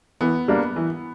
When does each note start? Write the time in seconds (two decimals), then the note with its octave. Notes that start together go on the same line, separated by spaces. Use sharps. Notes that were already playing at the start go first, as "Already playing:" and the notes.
0.21 E3 B3
0.48 G3 A#3 D4
0.76 E3